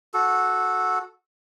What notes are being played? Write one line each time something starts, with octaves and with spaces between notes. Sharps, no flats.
F#4 A4